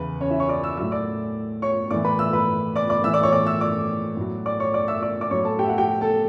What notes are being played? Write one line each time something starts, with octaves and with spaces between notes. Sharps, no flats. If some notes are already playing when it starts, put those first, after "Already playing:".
Already playing: E2 C#3 E3 B4
C#4 C#5
E4 E5
C#5 C#6
D5 D6
E5 E6
A2 F#3 E5 E6
D5 D6
C#5 C#6
A2 E3 D5 D6
B4 B5
E5 E6
B4 B5
D5 D6
D5 D6
A2 E3 E5 E6
D5 D6
C#5 C#6
D5 D6
E5 E6
D5 D6
A2 F#3
D5 D6
C#5 C#6
D5 D6
E5 E6
D5 D6
D5 D6
A2 F#3 C#5 C#6
A4 A5
G4 G5
E5
F#4 F#5
G4 G5
A4 A5